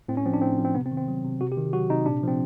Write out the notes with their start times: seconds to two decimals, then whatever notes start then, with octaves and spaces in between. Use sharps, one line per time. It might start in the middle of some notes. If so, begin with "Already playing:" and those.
0.09 A2 C4
0.17 C#4
0.25 F3 C4
0.33 D4
0.42 A2 C4
0.58 F3
0.64 C4
0.75 C3 B3
0.86 C4
0.91 D#3
0.97 C4
1.08 F#3
1.24 C3
1.41 C3 F#4
1.52 G4
1.57 D#3
1.73 F#3 F#4
1.90 C3 D#4
2.06 A#2 D4
2.23 F3 C4